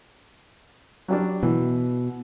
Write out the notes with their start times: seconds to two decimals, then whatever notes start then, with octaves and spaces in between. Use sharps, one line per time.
1.08 F#3 G3 D4
1.43 B2 E3